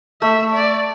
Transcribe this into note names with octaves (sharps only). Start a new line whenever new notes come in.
A3 E5
D5